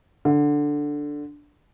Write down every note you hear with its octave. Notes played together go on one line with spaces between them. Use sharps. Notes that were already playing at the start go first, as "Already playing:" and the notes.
D3